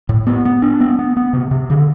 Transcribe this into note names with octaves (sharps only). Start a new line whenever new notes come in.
A2
B3
B3
D4
B3
B3
B3
C3
C3
D3